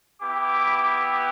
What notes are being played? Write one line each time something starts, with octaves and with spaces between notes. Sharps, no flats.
B3 E4 G4 D6